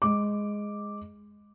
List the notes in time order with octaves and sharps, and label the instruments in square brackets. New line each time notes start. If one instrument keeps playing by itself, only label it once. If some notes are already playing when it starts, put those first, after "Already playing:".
[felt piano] G#3 D6